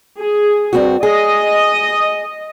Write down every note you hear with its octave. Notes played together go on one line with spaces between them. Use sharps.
G#4
G2 C4 F#4
G#4 D#5